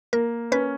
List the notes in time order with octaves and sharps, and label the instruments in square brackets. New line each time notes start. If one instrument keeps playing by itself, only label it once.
[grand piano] A#3 [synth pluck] A#4
[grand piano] C#4 [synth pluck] B4